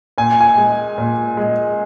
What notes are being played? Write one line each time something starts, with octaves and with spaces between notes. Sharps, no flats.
A#2 G#5
G#5
G#3
A#2
G#3